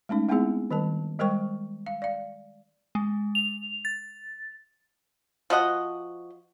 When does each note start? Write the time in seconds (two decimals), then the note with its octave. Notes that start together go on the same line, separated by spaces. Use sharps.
0.09 G#3 A3 C#4 D#4
0.29 G#3 B3 C4 D#4 E4 G#4
0.71 D#3 G3 A#4 A5
1.19 G3 G#3 A#4 C5 G5 C#6
1.86 F5
2.02 D5 F5
2.95 G#3
3.35 F7
3.85 A6
5.50 F3 F#4 D#5 F#5